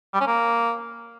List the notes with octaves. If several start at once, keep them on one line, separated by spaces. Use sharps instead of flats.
G3
C#4
A#3